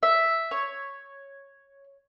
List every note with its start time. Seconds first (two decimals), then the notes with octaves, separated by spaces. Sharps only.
0.03 E5
0.51 C#5